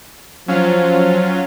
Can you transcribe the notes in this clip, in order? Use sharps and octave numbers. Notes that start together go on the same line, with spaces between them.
F3 F#3 C#4 F4